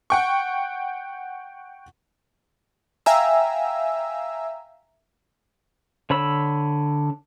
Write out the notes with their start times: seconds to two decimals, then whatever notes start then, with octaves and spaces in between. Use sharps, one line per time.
0.10 F#5 G5 C#6
3.06 E5 F5 G5 G#5 A#5 E6
6.10 D3 C#5 B5 E6